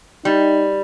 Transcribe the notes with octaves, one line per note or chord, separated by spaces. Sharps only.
G3 D#4